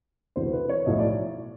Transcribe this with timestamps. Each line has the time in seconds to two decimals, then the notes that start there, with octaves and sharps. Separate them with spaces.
0.36 E1 D2 C3 E3 C5
0.53 B4
0.69 C#5
0.86 B1 A2 F3 D#5
0.99 D5